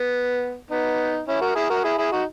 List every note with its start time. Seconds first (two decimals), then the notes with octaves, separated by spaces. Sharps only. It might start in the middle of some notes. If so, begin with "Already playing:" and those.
Already playing: B3
0.70 B3 D#4
1.28 C#4 E4
1.41 F#4 A#4
1.55 E4 G#4
1.70 F#4 A#4
1.84 E4 G#4
1.98 E4 G#4
2.12 D#4 F#4